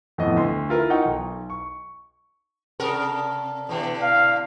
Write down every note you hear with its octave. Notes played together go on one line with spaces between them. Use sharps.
F2 A2 B3 D#5
D2 C6
E4 F4 A#4
D#4 F#5 G5 C#6
B1
C#6
C3 A4 A#4
B2 D3 E3
F5